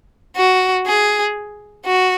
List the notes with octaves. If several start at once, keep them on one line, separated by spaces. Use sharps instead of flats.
F#4
G#4
F#4